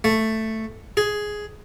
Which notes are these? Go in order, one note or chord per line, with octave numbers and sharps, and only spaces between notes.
A3
G#4